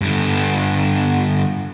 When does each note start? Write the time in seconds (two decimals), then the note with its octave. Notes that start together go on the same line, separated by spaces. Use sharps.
0.01 G2 D3